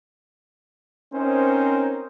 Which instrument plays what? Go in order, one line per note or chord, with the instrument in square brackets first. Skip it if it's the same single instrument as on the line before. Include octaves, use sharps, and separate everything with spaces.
[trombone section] C4 C#4 D#4 A#4 C5